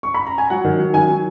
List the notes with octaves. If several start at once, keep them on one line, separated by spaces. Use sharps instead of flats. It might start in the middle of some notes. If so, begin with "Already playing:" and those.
C#6
B5
A#5
G#5
F#3 F#5
D#3
F#3
D#3 G#5
F#3